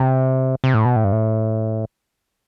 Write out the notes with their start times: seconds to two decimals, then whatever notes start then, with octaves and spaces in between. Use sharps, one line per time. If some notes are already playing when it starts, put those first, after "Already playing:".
Already playing: C3
0.64 C3
0.74 A2
0.85 B2
0.96 A2
1.04 G2
1.12 A2